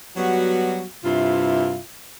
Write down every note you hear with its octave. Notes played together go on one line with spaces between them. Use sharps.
F#3 G3 B3 F#4
G2 C3 E4 F4